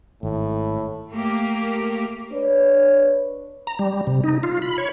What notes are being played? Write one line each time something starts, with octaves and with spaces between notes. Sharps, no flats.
G#1 A2
A3 A#3 G4
D4 B4 C#5
A#5
G3
C3
D#4
F4
B5
C#5